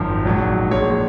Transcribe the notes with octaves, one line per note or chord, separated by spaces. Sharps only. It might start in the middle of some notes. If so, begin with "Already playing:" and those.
Already playing: G#1 F#2 F3
A#1 G#2 F#3
A#1 A#2 G#3 C#5